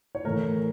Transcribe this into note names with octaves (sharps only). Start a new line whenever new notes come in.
C#5
A2 E3 A3 A#4